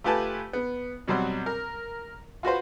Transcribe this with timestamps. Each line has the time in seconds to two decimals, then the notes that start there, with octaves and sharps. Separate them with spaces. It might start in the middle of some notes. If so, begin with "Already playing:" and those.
0.04 A3 F4 G4 B4 G#5 A5
0.53 B3
1.08 B2 F#3 G3 C4 C5
1.46 A#4
2.43 F4 F#4 B4 C5